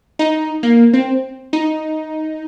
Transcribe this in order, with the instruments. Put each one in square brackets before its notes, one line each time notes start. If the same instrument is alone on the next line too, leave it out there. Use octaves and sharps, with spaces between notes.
[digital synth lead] D#4
A#3
C4
D#4